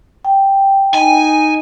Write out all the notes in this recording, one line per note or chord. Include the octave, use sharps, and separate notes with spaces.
G5
D#4 G#5